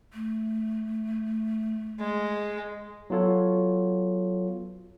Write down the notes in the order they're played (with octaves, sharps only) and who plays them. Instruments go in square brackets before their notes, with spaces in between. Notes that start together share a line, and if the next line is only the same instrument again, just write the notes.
[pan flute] A3
[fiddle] G#3
[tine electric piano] F#3 B3 F4 A4 C#5